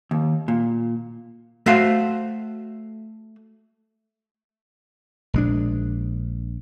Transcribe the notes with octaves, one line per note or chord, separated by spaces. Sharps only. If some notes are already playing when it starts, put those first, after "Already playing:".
D#2
A#2
A3 F#4 C5 F5
A#1 G#3 D4